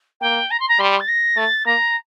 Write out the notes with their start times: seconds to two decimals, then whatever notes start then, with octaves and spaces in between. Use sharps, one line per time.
0.21 A#3 G5
0.51 A#5
0.60 C6
0.68 A#5
0.79 G3 C6
1.00 A6
1.08 A#6
1.37 A3 A6
1.66 A#3 A#5